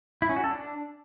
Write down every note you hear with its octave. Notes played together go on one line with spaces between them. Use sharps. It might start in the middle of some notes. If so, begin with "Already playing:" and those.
E4
C#4
F#4
A4
D4